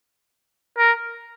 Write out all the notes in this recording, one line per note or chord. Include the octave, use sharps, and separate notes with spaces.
A#4